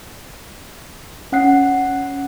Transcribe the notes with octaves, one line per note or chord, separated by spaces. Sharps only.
C#4 F#5 F#6 C7